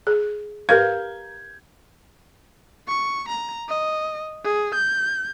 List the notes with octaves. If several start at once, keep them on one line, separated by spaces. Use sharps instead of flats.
G#4
G4 A#4 B4 F5 G6 G#6
C#6
A#5
D#5
G#4
G6